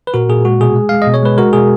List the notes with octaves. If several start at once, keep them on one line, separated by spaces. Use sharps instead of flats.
B4
A#2 F#4 A#4
A#2 G#4
G#3 F#4
B2 G#4
G#3
G#3 F5
D#5
B2
C#5
G#3 B4
G#3 F#4 A#4
B2 G#4